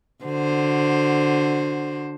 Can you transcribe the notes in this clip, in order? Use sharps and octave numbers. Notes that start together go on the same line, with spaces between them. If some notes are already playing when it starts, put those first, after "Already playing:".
D3 F#4 C5